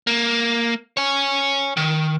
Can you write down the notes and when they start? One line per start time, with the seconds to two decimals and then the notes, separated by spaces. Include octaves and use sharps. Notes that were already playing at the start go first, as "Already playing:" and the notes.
0.07 A#3
0.97 C#5 G#5
1.77 D#3